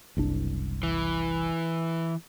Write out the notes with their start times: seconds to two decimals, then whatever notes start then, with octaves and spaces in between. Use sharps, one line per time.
0.17 F#1 C2 D4
0.83 E3